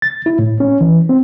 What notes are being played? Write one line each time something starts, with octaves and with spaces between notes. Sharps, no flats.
A6
E4
A2
C#4
E3
C4